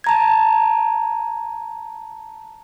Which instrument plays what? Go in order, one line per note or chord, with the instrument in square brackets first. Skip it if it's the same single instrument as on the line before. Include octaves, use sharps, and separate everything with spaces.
[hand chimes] A5 A#5 G#6